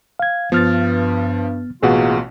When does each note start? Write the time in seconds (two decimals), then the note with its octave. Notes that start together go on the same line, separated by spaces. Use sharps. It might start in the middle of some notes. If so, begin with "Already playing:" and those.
0.19 F5 G#6
0.52 G2 F3 B3 F6 A6
1.83 A1 B2 A#3 F4 F#4 G#4 F#5